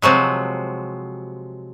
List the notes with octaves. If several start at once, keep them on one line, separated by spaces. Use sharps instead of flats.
C3 F3 F#3 G#3